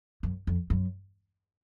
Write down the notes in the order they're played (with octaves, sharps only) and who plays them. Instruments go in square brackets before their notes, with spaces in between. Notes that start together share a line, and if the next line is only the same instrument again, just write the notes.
[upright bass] F#2
F2
F#2